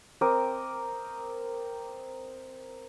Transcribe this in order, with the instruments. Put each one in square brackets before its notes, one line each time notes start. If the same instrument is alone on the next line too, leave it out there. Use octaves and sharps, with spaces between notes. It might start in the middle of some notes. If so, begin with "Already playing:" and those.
[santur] C4 A#4 D#5 D6